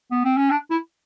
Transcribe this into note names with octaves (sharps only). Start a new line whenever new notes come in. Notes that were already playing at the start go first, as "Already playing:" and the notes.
B3
C4
C#4
D4
E4